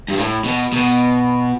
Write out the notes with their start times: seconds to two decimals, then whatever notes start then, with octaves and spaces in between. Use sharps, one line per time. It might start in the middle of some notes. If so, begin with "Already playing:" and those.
0.08 G2
0.16 A2
0.44 B2
0.73 B2